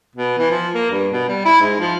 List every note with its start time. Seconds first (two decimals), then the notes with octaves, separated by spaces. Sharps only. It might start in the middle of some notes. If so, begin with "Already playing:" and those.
0.16 B2
0.38 E3
0.51 F3
0.75 A#3
0.91 G2
1.13 B2
1.28 G3
1.45 E4
1.61 G#2
1.80 F3